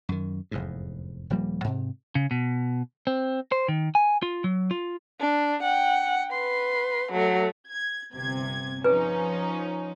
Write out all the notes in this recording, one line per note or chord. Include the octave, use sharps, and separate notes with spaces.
F#2 D#3
F1 E2 G#2
D#1 F3 G3 A#3
G#2 C3
C#3
B2
C4
C5
D#3
G#5
F4
F#3
F4
D4
F#5 G5
B4 C6
F#3 A3
G#6
G1 C3 G#6
F3 C#4 D#4 G#4 B4